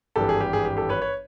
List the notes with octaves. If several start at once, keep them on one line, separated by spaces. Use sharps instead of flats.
G#1 G2 E3 G4 A4
G#4
G4
G#4
G4
G4 A4
B4 C#5
B4 C#5